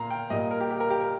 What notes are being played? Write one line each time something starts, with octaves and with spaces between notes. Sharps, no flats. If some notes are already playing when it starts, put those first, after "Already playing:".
Already playing: A#2 A#3 F5 A#5
G5
A#2 G3 A#3 D#5
A#4
G4
G4
A#4
G4
A#4